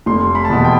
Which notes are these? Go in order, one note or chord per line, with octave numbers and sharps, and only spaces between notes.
F1 C6
B5
A5
E2 B2 B5
G5